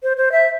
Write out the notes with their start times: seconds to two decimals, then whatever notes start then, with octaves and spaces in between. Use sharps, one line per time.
0.03 C5
0.17 C5
0.32 E5